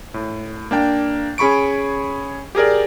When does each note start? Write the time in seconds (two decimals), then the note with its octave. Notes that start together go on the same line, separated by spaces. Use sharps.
0.14 A2
0.71 A#3 D4 G5
1.38 C#4 G#4 B5 C#6 D7
2.55 G4 G#4 A#4 D5